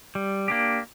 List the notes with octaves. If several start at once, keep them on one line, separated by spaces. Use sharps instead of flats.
G3
A#3 D4 G4